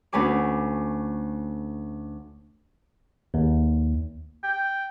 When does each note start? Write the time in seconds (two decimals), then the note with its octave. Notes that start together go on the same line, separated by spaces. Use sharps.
0.13 D2 A3 C#4 B4 G#5 D6
3.34 D#2
4.44 G5